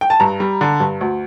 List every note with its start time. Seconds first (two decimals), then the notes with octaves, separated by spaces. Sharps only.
0.01 G5
0.10 A5
0.20 G2 A#5
0.40 G3
0.61 D3
0.80 G2
1.01 D2